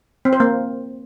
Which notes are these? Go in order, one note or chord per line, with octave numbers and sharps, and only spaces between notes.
C4
C5
A#3